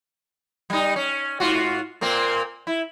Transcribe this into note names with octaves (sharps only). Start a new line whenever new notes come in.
G3 D#4
C#4
G#2 F4 F#4
A#2 A#3 C4
E4